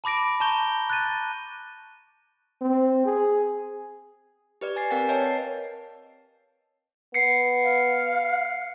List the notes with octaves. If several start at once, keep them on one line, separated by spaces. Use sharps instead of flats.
A5 B5 D6 A#6 D7
A5 A#5 C#6 G6 G7
F#6 A6 D#7
C4
G#4
G4 B4 D5
G#5 A6 C7
C4 A#4 D5 F5 G5 A6
B4 C#5 D#5 A5
C7
B3 C7 C#7
F5